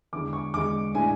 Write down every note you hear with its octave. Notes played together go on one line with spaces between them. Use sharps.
E2 D3 G#3 D6
C#6
E2 D3 G#3 D6
A2 G#3 D4 G#5